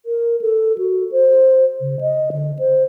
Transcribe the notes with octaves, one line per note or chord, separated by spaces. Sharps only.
A#4
A4
F#4
C5
C#3
D#5
D3
C5